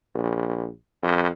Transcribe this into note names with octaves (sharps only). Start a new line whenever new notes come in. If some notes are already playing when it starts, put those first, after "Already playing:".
A#1
F2